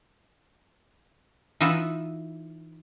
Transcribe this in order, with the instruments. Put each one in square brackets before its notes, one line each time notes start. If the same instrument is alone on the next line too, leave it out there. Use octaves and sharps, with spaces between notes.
[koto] E3 D#4 F4 E5 F#5